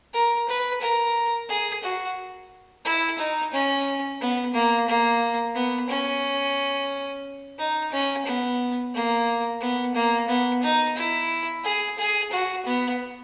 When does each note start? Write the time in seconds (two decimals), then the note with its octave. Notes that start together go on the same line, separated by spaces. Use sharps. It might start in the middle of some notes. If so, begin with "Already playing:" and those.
0.13 A#4
0.48 B4
0.81 A#4
1.49 G#4
1.83 F#4
2.85 E4
3.18 D#4
3.53 C#4
4.20 B3
4.54 A#3
4.87 A#3
5.55 B3
5.89 C#4
7.58 D#4
7.91 C#4
8.25 B3
8.94 A#3
9.60 B3
9.94 A#3
10.28 B3
10.63 D#4
10.96 E4
11.64 G#4
11.98 G#4
12.31 F#4
12.65 B3